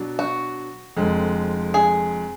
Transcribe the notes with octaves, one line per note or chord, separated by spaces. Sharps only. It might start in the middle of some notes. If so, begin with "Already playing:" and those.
Already playing: B2 F#3 D4
F#4
F1 F2 D3 G#3
G#4